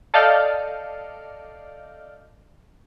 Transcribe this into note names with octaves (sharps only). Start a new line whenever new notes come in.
A4 D5 D#5 F5 F6 G6